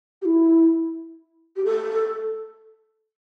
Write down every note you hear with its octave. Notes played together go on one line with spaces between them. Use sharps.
G4
E4
G4
A4